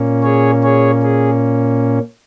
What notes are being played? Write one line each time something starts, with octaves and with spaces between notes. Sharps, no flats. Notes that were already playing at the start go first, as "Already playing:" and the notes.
Already playing: A#2 A#3 C#4
G#4 C#5
G#4 C#5
G#4